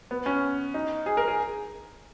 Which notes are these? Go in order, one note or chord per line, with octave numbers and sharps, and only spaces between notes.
B3
C#4
D#4
G#4
A#4
G#4